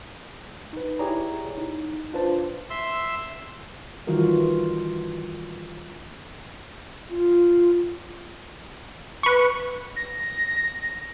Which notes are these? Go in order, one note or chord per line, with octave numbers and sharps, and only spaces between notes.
D#4 B4
E4 G4 G#4 C#5 D5 A#5
D#4
D4 F4 B4 C5 A5
E5 C6 E6
D#3 E3 G3 F4 F#4 A#4
F4
B4 C#6
A#6